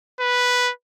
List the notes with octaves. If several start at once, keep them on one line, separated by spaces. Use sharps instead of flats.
B4